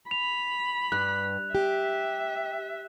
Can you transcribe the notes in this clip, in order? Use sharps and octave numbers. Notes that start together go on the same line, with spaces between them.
B5 F7
G2 F#6
G4 E5